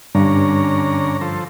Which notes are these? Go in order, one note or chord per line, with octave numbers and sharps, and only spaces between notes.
G2 D3 C#4 A#5
F3 A4 C5